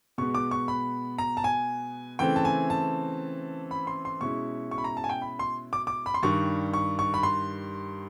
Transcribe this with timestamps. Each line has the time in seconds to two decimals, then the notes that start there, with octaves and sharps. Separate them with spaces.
0.18 B2 G#3 B3 C#6
0.35 D6
0.51 C#6
0.68 B5
1.18 A#5
1.37 A5
1.44 G#5
2.19 C#3 E3 A3 C4 G5
2.36 A5
2.45 G#5
2.70 A5
3.71 B5
3.87 C6
4.05 C6
4.21 B2 G#3 C#4 E4 C#6
4.71 C#6
4.78 B5
4.84 A#5
4.97 A5
5.04 G#5
5.09 G5
5.22 B5
5.39 C6
5.73 D6
5.87 D6
6.06 B5
6.14 C6
6.23 G2 D#3 G3 C#6
6.74 C#6
6.99 C#6
7.14 B5
7.23 C6